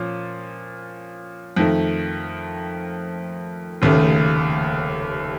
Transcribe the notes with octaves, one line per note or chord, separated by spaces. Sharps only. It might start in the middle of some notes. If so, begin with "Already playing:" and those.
Already playing: A#2 F3 C#4
F2 D#3 A3
F1 D#2 C#3 A3